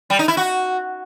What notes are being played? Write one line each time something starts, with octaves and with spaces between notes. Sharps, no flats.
G3
D#4
E4
F#4